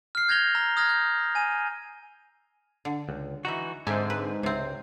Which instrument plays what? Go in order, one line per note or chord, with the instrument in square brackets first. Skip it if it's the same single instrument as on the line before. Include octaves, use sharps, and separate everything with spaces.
[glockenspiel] F6 C7
G6 G#6 A#6 F7 G7
A#5 E6
D#6 F6 G#6 A#6
G6
G#5 D#7
[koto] D3
[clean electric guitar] C#2
[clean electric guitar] E3 D#4 F#4 [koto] E5 A#5
[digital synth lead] G#2 [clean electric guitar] D3 C4 [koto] E5 G#5
[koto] B4
[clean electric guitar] C#2 [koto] C3 C4